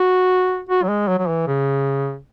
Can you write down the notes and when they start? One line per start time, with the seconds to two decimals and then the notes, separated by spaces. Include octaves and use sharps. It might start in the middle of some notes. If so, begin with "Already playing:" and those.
Already playing: F#4
0.69 F#4
0.83 F#3
0.89 G#3
1.08 F#3
1.19 F#3
1.28 E3
1.47 C#3